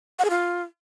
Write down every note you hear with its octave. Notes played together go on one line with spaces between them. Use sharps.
F#5
G#4
F4